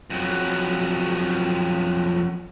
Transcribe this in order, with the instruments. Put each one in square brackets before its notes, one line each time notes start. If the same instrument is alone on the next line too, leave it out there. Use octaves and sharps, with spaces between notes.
[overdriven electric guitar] F2 F#3